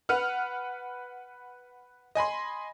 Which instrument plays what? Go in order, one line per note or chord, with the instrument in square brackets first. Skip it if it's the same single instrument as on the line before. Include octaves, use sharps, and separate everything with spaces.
[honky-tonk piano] B4 F#5 F6
D#5 G#5 B5 C6